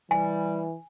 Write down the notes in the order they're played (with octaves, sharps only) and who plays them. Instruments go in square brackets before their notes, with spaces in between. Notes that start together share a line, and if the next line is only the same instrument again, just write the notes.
[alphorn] E3 [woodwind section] G3 [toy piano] G#5